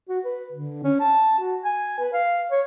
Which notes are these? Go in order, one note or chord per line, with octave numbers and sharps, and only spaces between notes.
F#4
B4
D3
C#4
A5
F#4
G#5
B4
F5
C#5